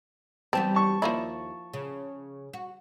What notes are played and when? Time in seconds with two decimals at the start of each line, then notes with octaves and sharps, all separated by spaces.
0.53 E3 G3 B3 C4 A5
0.75 A5 C#6
1.02 D#2 F3 A#3 E4 D5
1.73 C#3
2.53 F#4